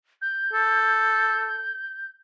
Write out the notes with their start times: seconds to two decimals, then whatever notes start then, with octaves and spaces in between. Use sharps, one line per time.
0.21 G6
0.53 A4